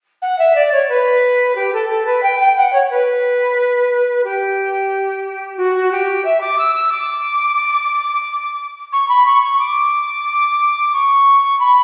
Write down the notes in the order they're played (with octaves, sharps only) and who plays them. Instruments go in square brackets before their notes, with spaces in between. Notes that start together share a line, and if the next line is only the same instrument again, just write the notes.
[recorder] F#5
E5
D5
C#5
B4
G4
A4
A4
B4
G5
G5
F#5
C#5
B4
G4
F#4
G4
E5
D6
E6
E6
D6
C#6
B5
C#6
C#6
D6
C#6
B5